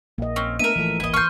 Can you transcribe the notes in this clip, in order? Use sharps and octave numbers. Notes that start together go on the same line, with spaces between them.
A#1 A#3 D#5
C4 C#4
A3 B3 D4 A#4 E5 D#7
A1 E3 F3 A3
D1 G#1 A#3 E4 D#5
C6 C#6 F6 G6